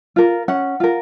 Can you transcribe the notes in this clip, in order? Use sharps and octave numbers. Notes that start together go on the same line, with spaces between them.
F4 A#4
C#4 F#5
F4 A#4